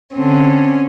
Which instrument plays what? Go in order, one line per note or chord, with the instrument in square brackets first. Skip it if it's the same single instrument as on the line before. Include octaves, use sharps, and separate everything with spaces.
[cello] D3 C4 [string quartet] C#4